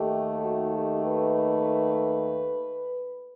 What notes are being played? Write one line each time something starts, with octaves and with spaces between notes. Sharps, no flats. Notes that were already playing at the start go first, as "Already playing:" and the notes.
Already playing: D#2 D#3 A3 G4
F#4
G4
B4